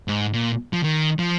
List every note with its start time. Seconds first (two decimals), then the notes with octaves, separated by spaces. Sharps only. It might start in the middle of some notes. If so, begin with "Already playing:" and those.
0.08 G#2
0.33 A#2
0.73 F3
0.83 D#3
1.19 F3